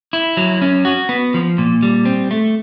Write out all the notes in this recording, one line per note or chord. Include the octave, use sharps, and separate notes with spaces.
E4
F#3
C#4
F#4
B3
F3
A#2
G3
C4
A3